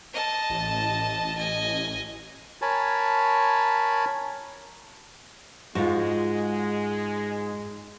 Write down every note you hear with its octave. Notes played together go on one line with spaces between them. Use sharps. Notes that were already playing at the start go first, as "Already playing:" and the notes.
D#5 A5
A1
D#5 G#5
A#4 C#5 G#5 A5 B5
G#2 G#3 F4 F#4